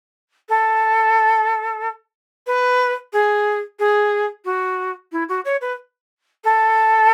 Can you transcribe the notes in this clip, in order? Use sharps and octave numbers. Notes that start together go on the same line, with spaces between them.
A4
B4
G#4
G#4
F#4
E4
F#4
C#5
B4
A4